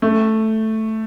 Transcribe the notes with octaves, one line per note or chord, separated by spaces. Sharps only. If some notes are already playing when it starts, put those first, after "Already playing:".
A3